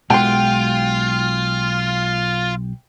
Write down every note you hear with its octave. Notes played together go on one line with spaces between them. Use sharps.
B1 G#3 F4 F#5 G5 C6